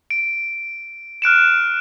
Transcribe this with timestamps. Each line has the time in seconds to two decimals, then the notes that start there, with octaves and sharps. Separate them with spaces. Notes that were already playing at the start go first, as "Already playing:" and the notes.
0.10 D7
1.22 F6 F#6 D7 E7